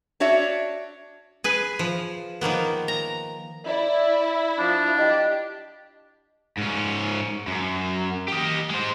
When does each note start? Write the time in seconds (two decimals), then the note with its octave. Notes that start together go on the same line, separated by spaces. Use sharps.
0.20 D4 F#4 C#5 E5
1.44 G#4 B4 G#5
1.79 F3
2.41 D#3 F3 A#3 B3
2.88 A#5
3.66 E4 D5
4.59 F3 D4
4.99 G4 D#5
6.58 G#2 C#4
7.47 F#2
8.28 G4 D#5
8.70 G#3 C5